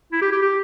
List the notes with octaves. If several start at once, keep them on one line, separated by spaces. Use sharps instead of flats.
E4
G4
G4
G4